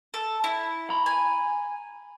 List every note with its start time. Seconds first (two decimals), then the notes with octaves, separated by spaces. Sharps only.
0.14 A4
0.44 E4
0.90 A#5 B5
1.06 G#5